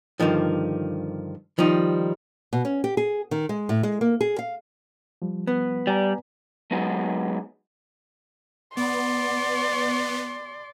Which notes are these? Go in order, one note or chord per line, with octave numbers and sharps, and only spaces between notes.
G2 B2 D3 D#3 F3
D#3 F3 G3 D#4
B2
C#4
G4
G#4
D#3
G#3
A2
G#3
A#3
G#4
F5
F3 G3
B3
G3 D5 G#5 A#5
F#3 G#3 B3 D#4 F#4 G#4
B3 D5 C6